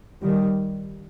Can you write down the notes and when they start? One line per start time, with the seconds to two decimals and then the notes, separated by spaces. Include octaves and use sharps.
0.22 D#3 G3